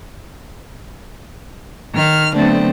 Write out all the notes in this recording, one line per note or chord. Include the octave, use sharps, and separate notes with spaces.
D#3 F6
D3 F#3 A3 B3 C4 D4